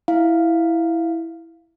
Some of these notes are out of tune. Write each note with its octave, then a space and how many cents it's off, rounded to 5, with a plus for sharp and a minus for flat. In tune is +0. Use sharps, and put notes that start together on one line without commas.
E4 +0 F5 +0